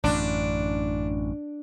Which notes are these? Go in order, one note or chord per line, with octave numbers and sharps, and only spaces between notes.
A1 F#2 D4